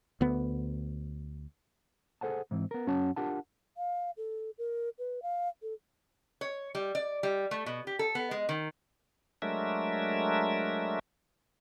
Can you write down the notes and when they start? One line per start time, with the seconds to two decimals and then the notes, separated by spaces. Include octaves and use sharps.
0.21 D2 B3
2.21 G#4 A4 C5 F#5 A5
2.51 G#2 E3 C4
2.71 B3 A#4
2.87 F#2 C#4 F#4 C#5 F#5 A5
3.16 D4 F4 G4 A#4 F#5 A5
3.77 F5
4.17 A4
4.58 A#4
4.99 B4
5.22 F5
5.62 A4
6.41 C#5
6.75 G3
6.95 D5
7.23 G3
7.51 A3
7.66 B2
7.87 G4
7.99 A4
8.15 B3
8.31 G#3
8.49 D#3
9.42 F#3 G#3 A3 D4 A#4 E5